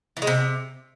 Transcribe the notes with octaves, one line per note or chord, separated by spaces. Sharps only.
E3
G#3
C3